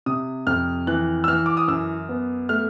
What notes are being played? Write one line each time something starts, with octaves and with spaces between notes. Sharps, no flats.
C3 D#6
F2 F6
E3 F#6
E6
E3 F6
D6
D#6
F#2 E6
B3
A3 F6